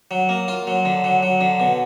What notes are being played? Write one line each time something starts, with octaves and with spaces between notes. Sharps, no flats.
F#3
A#3
F4
F#3
D3
F#3
F#3
D3
B2